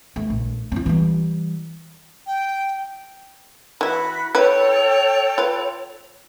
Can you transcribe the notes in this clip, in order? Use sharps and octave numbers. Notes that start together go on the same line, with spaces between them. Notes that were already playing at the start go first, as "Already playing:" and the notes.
A3
A#1
C4 F4
E3 G3
G5
E3 E4 F#4 B5
E4 A4 B4 C#5 G5
F4 B4